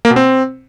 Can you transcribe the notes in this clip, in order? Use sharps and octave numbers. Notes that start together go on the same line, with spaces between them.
A#3
B2
C4